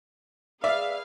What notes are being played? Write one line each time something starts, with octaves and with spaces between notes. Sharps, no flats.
G#4 B4 D5 E5 F5